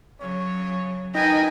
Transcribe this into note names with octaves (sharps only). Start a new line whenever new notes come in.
C#3 F#3 C#5
D#4 A#4 B4 G5 G#5 A#6